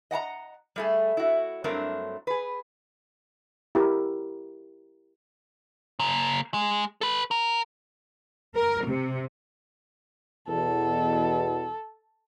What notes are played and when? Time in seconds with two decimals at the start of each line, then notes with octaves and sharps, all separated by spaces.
0.11 D#5 F#5 A5 A#5
0.76 G3 A3 G#4
1.17 E4 F#4
1.64 G2 F#3 A3 C4 D4 A#4
2.27 G#4 B4
3.75 E4 G4 A#4
5.99 C#3 A#3
6.54 G#3
7.01 A4 B4
7.31 A#4
8.56 A#4
8.86 C3
10.48 E2 B2 A4